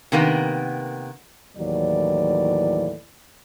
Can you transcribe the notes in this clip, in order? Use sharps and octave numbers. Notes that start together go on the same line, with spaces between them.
C3 D#3 A#3 B3
D#2 A2 E3 F#3 D5